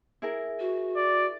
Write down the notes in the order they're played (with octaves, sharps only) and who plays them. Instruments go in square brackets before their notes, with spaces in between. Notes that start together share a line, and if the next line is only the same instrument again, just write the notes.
[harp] E4 G#4 A#4
[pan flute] F#4
[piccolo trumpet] D5